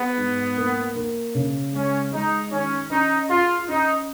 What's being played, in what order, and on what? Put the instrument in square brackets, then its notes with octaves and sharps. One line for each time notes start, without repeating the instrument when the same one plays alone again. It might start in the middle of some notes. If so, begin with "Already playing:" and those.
Already playing: [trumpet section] B3 [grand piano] G#4
[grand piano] G#2
A#3
A#3
C#3
[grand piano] G#3 [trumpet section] C#4
[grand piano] G#3 [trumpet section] D#4
[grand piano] D#3 [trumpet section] C#4
[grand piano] C#4 [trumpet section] D#4
[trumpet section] F4 [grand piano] G#4
[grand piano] C#4 [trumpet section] D#4